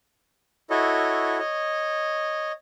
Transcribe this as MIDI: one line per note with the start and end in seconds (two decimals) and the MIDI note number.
0.70 1.39 64
0.70 1.39 66
0.70 1.39 69
0.70 1.39 73
0.70 1.39 75
1.39 2.52 73
1.39 2.52 75